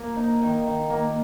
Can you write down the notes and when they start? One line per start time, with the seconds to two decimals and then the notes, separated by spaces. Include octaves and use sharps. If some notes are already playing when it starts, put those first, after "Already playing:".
Already playing: A#3
0.17 D#4
0.41 D#3
0.66 D#3
0.90 A#3